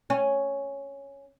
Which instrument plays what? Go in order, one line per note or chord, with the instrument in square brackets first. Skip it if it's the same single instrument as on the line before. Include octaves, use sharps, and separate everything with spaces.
[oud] C#4